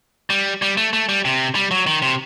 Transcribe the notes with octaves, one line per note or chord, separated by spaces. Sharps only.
G3
G3
A3
A3
G3
C3
G3
F#3
D#3
C3